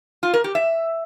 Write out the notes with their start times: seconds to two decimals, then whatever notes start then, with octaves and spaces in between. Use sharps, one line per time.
0.23 F4
0.34 A#4
0.44 G4
0.55 E5